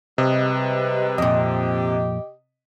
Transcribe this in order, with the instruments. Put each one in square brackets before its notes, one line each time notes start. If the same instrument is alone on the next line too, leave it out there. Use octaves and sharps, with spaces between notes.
[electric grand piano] C3 [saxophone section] G3 G#3 B4 [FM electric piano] D#5
[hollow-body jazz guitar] F2 A#2 [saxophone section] G4 [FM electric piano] D#5